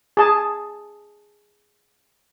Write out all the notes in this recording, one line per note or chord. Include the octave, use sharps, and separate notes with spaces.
G#4 A5